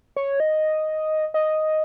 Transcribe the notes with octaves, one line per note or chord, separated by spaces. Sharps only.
C#5
D#5
D#5